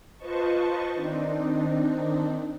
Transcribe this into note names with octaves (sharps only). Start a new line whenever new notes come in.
F4 B4 C5 D#5 A5 C#6
D#3 C4 D4 D#4